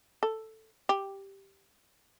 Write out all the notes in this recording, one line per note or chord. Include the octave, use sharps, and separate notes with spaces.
A4
G4